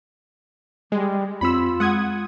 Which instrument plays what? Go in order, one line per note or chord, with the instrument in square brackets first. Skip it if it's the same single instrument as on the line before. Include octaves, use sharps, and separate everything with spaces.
[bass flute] G3 [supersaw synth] G#3
[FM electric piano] F2 C4 [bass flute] F4 [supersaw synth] B5 E6
[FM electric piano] G#3 [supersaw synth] F#5 D#6 G#6